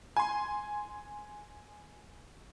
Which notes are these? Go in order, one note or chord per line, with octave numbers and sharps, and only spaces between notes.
G#5 C6